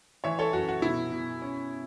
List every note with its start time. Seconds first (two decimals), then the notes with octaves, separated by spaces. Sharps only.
0.24 E3 C#5 E5
0.39 A4 C#5
0.53 F#2 F#4
0.69 F#4
0.82 B2 E4
1.12 B2
1.42 C#4